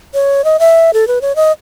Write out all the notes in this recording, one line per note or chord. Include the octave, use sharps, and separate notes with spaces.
C#5
D#5
E5
A4
B4
C#5
D#5